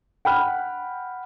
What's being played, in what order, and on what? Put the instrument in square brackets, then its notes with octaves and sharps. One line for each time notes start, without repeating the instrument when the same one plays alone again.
[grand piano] F#5 G5 B5 F6